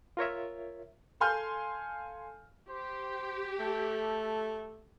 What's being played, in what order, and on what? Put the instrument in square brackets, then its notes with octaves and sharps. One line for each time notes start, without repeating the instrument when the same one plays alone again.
[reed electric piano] F4 A#4 C#5 E5
[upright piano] A4 F5 G#5 C6 F6 G6
[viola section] G4 [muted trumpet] C5
[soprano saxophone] A3 [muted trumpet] A4